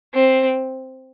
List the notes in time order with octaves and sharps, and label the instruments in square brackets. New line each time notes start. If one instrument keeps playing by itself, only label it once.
[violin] C4